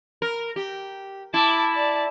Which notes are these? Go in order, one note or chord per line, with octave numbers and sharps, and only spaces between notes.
A#4
G4
E4 A5 D6
D5 A5